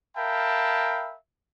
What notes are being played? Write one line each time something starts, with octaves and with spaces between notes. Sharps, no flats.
A#4 E5 F5 G5 A5 B5